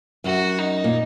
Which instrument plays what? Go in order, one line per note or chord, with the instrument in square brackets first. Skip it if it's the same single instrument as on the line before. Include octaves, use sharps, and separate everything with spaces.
[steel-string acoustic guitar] F#2 [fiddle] F#4
[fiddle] D#4
[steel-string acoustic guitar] A#2